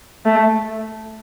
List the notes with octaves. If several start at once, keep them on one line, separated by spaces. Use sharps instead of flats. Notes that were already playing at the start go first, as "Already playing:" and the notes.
A3